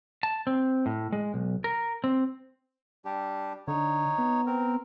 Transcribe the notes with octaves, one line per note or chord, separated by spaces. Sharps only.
A5
C4
A2
G#3
B1
A#4
C4
G3 D4 G4
D3 D#4 C#5
B3
C4 A#4